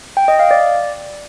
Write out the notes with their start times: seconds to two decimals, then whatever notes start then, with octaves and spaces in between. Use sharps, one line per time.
0.17 G5
0.28 D#5
0.39 F5
0.51 D5